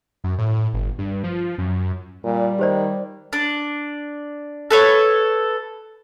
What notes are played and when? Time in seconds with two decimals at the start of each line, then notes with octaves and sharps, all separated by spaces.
0.24 F#2
0.38 A2
0.73 G1
0.99 G2
1.24 F3
1.58 F#2
2.24 A#2 G3
2.59 D#3 G4 C5 D5
3.33 D4
4.70 A4 B4 C#5